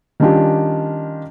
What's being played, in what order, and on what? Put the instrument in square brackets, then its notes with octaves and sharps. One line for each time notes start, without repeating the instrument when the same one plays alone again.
[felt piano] D#3 G3 C#4 D4 F4 G4